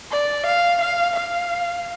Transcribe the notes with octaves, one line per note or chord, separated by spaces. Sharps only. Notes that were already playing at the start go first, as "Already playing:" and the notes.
D5
F5
F5
F5